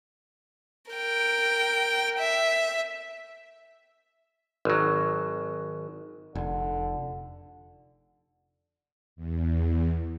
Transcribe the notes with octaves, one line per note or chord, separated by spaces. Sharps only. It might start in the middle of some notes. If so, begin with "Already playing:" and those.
A#4 G5
E5
G#1 F#3
F1 D3
E2